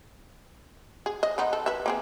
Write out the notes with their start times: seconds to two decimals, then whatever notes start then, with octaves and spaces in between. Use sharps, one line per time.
1.06 G#4
1.23 D#5
1.38 G#3 B3 D#4
1.53 A4
1.66 B4 E5
1.86 A#3 C4 G#4